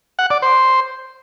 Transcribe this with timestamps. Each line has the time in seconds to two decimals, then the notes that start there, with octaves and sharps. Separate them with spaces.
0.19 F#5
0.30 D5
0.42 C5